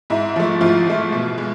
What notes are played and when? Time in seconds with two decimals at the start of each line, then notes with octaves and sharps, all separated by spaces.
0.10 G#2 E4
0.36 F3 A3
0.61 G#2 F3 F4
0.87 F3 A3
1.12 B2
1.38 G#3